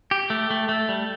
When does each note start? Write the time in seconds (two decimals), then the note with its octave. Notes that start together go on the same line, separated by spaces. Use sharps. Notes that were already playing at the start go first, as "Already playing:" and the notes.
0.11 G4
0.30 A3
0.51 A3
0.69 A3
0.89 G3